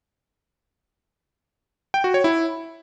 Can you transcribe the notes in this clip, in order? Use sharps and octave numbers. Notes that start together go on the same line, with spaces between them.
G5
F#4
C#5
E4